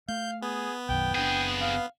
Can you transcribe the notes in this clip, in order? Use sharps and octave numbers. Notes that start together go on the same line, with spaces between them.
A3 F5 G6
B3 G#4
B1 F#2 D#3 G5
F#1 F2 D4 G#4 G5
F5